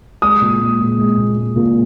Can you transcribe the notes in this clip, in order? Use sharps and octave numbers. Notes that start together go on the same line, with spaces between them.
G#3 D#6
A#2
G#3
A#2
G#3
A#2
G#3
A#2